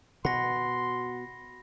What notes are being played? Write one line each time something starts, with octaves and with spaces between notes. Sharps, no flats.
B2 F#5 B5 C6 A#6